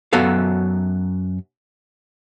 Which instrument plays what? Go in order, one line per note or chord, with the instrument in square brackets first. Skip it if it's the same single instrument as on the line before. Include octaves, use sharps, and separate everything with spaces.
[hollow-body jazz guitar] F#2 F#3 B3 A4 F5